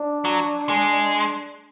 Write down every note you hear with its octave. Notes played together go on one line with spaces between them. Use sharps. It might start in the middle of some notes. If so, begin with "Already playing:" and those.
Already playing: D4
F#3
G#3